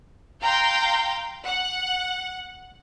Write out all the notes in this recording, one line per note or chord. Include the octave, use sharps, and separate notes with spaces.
F5 G5 A#5 C6 G6
F#5